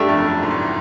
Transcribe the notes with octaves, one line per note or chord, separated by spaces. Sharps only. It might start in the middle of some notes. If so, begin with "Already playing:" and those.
Already playing: G2 A3 D4 G4
F2
F#2
G#2
A2